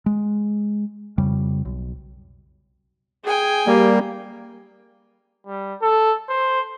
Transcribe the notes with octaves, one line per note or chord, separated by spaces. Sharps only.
G#3
F2 C#3 G3
B1
G#4 G5 G#5
G3 A#3
G3
A4
C5